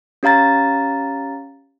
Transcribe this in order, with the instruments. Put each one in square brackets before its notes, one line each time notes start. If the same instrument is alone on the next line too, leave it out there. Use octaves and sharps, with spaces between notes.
[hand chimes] C#4 G4 F5 A#5 A6